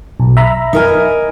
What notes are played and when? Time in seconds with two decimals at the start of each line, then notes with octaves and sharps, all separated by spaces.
0.20 B1
0.37 E5 A#5 B5
0.73 D#4 A#4 G#5